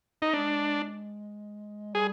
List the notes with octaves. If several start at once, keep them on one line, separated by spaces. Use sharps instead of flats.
D#4
G#3 D4
G3 G#4